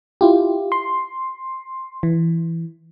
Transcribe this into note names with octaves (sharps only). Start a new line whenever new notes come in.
E4 F4 G4
C6
E3